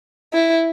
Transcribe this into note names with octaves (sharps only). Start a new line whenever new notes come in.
E4